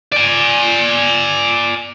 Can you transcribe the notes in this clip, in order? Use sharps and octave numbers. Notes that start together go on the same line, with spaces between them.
D5 G#5